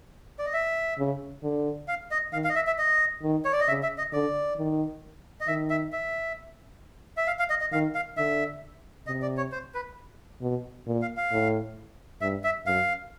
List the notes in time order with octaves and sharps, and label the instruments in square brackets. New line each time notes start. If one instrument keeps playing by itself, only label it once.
[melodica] D5
D#5
E5
[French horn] C#3
D3
[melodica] F5
D#5
[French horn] D#3 [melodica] F5
[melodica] F5
D#5
E5
E5
D#5
[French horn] D#3
[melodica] C#5
D5
D#5
[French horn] C#3 [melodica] E5
[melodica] E5
D#5
[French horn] D3 [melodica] D5
[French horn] D#3
[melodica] D#5
[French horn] D#3 [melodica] E5
[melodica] E5
E5
E5
F5
F5
D#5
D#5
[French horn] D#3 [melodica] F5
[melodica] F5
[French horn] D3 [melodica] E5
[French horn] C3 [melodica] D#5
[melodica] D5
C#5
C5
B4
[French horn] B2
A#2
[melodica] F5
F5
[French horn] A2
[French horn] G2 [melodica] E5
[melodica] E5
[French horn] F#2 [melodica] F5